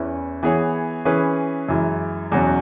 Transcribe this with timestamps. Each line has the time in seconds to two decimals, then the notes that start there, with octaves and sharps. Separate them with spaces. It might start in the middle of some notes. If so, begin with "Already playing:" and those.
Already playing: E2 E3 C#4 E4 B4
0.43 E3 B3 G#4 C#5
1.05 E3 C#4 G#4 B4
1.69 F#2 E3 G#3
2.32 E2 B2 F#3 C#4